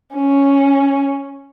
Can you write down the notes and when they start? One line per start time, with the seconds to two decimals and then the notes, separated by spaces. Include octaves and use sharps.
0.14 C#4